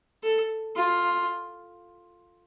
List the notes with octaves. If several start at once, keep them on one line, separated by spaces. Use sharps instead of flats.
A4
F4